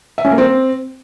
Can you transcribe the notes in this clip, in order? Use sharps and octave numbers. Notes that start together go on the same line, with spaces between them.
E5
C#4
A#3
C4